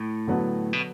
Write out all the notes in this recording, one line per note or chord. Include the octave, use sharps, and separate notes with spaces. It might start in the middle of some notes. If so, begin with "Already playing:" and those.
Already playing: A2
D3 F#3 B3
B2